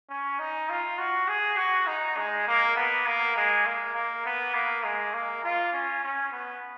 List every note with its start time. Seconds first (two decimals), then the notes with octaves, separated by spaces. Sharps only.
0.09 C#4
0.39 D#4
0.69 F4
0.98 F#4
1.28 G#4
1.57 F#4
1.87 D#4
2.17 G#3
2.47 A#3
2.76 B3
3.06 A#3
3.36 G#3
3.66 A#3
3.95 A#3
4.25 B3
4.54 A#3
4.84 G#3
5.14 A#3
5.44 F4
5.73 C#4
6.03 C#4
6.32 B3